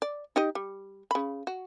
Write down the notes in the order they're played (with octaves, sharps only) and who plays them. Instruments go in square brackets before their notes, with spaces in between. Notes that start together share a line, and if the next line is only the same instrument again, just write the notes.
[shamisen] D5
D#4 G4 D#5
G3
C#3 B5
F#4